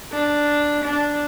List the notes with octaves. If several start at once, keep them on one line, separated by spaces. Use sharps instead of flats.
D4
D4